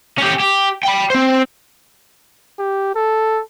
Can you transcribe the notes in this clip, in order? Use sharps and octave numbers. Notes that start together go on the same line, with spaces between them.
C#4 G4
G4
G5 B5
C4 C5
G4
A4